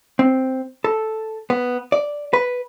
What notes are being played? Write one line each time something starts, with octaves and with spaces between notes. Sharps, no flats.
C4
A4
B3
D5
B4